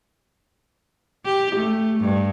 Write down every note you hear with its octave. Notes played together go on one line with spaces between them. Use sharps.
G4
A3
G2